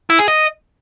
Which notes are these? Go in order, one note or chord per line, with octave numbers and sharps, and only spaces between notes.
E4
G#4
D#5